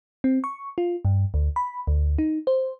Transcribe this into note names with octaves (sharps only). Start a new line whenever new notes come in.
C4
C#6
F4
G2
D2
B5
D2
D#4
C5